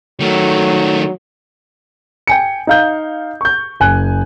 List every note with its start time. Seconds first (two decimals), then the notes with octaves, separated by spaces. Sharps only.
0.21 D#3 F#3 A3
2.27 G5 G#5 C#7
2.67 D#4 F5 G6
3.41 C#6 G6
3.80 F#1 G#5 F#6